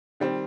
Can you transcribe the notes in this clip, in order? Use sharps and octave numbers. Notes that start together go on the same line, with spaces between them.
D#3 G3 C4